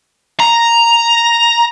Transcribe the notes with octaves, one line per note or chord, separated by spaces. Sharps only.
A#5